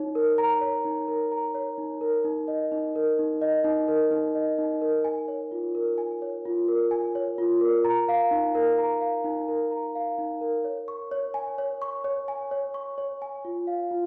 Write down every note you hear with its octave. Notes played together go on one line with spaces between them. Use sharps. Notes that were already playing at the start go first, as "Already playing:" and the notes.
Already playing: D#4 C#5
A#4
A#5
C#5
D#4
A#4
A#5
C#5
D#4
A#4
D#4
D#5
D#4
A#4
D#4
D#5
D#4
A#4
D#4
D#5
D#4
A#4
G#5
C#5
F4
A#4
G#5
C#5
F4
A#4
G#5
C#5
F4
A#4
A#5
F5
D#4
A#4
A#5
F5
D#4
A#4
A#5
F5
D#4
A#4
C#5
C#6
C#5
G#5
C#5
C#6
C#5
G#5
C#5
C#6
C#5
G#5
F4
F5
F4